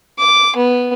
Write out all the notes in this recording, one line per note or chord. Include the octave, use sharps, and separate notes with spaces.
D6
B3